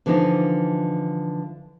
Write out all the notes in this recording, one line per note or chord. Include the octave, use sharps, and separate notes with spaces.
D3 E3 F3 D4 D#4